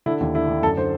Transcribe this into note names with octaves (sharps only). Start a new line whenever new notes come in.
D3 E4
D#2
D3 E4
D3
F#2 A4
D3 C5